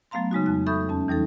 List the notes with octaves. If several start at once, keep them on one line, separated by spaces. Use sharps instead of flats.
F#3 A3 B3 F5 A#5 C6
C#3 G#3 D#4 F#4
F2 F#6
A4 E5 B5 C#6 D#6 G6
E2 C#4 A5
E3 G3 D#4 A4